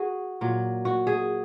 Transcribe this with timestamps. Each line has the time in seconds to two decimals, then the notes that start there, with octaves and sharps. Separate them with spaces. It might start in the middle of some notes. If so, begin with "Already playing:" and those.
Already playing: F#4 G#4
0.41 A#2 F#3
0.85 F#4
1.07 G#4